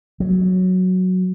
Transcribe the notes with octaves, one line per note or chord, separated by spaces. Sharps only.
F#3